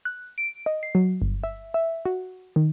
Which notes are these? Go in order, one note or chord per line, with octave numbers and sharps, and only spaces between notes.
F#6
D7
D#5
C7
F#3
G1
E5
E5
F#4
D#3